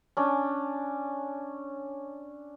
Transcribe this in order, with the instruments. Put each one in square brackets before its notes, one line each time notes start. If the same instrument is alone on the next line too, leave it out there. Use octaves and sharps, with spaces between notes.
[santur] C#4 D4